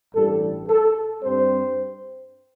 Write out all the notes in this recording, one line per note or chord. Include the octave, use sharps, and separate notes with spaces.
A1 G2 G3 A4
A4
G2 G3 C4 C5